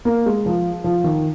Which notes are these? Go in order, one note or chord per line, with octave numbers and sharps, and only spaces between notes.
A#3
G#3
F3
F3
D#3